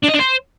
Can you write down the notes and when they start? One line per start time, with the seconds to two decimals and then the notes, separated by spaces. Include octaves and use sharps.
0.04 D4
0.09 D#5
0.14 D4
0.20 C5